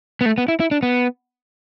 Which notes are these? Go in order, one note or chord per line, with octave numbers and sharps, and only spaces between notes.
B3
A3
B3
E4
E4
D4
B3